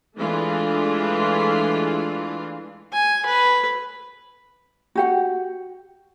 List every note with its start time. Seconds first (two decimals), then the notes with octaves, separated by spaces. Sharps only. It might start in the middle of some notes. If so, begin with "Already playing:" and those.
0.17 E3 G#3 A3 D4 F4
2.93 G#5
3.26 B4
4.95 F#4 G4 F#5